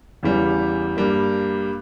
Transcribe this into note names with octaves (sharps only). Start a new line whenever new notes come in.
E2 C#3 E3 G3
G2 G3 A#3